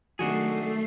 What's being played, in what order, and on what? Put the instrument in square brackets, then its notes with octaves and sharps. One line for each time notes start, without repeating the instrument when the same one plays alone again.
[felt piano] C3 D#3 F#3 [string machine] A3 C7 [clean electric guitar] D4 F#4 G#4